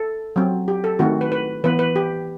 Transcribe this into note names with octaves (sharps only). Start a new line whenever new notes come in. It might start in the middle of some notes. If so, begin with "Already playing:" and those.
Already playing: A4
F#3 C4
G4
A4
D#3 A3 C4 F#4
B4
B4
E3 B3 B4
B4
G4